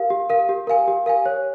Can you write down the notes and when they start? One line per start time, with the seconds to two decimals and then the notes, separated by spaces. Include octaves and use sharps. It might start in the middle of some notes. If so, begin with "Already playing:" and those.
Already playing: G4 A#4 F5
0.10 G4
0.30 A#4 F5
0.49 G4
0.67 A#4 F5 G#5
0.88 G4
1.06 A#4 F5 G#5
1.26 C#5